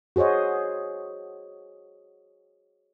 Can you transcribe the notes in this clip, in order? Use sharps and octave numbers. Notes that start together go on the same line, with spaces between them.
F#4 G#4 C5 C#5 D#5